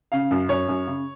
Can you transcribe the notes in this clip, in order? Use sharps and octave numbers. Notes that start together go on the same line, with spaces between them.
C#3 F5
F#2
F#2 C#5
F#2
C#3